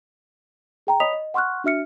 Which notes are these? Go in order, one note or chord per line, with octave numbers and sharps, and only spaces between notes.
G#4 G5 A#5
C#5 D#5 B5 D#6 B6 F7
D#5
F#5 C6 C#6 F6 F#6
D4 F#4 E5 F6 C#7